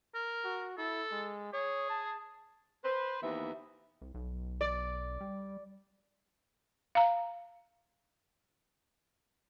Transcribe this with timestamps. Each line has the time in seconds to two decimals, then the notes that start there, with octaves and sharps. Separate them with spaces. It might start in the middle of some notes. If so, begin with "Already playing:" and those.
0.15 A#4
0.44 F#4
0.78 E4 A4
1.11 G#3
1.53 G#4 C#5
1.89 A5
2.85 B4 C5
3.22 D#2 E3 B3 E5
4.01 C2
4.14 B1
4.61 D5
5.21 G3
6.95 F5 A#5